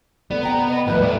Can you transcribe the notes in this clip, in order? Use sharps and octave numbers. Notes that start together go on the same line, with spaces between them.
B3 A4 D5
C3 G5 A#5
D#5
D#2 A2 E3 F3 B4
G2 A3 D5